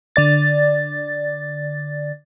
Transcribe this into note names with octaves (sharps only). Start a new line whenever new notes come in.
D3 D5 A6